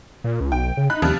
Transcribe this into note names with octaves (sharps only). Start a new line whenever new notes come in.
A#2
C#2
B1 G5
C#3
D#4 B5 F#6
D#2 C3 F3 G3